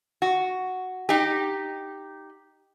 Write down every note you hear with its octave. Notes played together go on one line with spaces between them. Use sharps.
F#4
D#4 G4